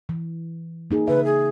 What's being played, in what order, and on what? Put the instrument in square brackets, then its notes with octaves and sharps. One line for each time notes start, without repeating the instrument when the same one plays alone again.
[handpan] E3
A#3 D#4 G#4
[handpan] C#3 E5 [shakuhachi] B4
[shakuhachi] G#4